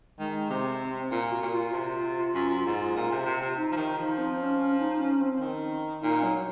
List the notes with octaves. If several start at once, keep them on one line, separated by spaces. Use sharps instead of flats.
D#3 G#3
C3 C4
A#2 F4
F#4
A#2
F4
C3 F4
F#2
G#2
A#2
C3
C3
C3
D#4
F3
D#3
F3
C4
C#4
C#4
D#4
C#4
C4
D#3
A#2 D#4
F#3